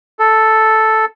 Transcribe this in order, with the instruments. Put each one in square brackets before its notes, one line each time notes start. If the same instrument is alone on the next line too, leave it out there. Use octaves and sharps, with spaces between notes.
[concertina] A4